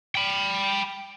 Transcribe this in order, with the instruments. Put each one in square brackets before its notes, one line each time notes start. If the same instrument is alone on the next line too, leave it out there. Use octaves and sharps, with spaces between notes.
[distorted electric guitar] G5 B5